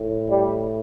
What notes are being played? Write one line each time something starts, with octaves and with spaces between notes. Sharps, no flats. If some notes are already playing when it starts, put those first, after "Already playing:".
Already playing: A2
G3